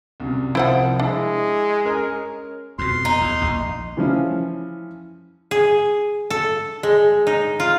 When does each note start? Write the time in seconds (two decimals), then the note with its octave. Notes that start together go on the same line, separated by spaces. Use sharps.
0.20 C2 F#2 C3
0.55 C2 F3 E4 C5 F#5 D7
0.99 G#3 D4 E4
1.85 C#4 A#4
2.79 F2 B2 C6
3.05 D#4
3.21 E2
3.41 A#1 D#2
3.97 E3 F3 C#4
5.51 G#4
6.30 A4
6.83 G#3
7.27 D#4
7.60 F4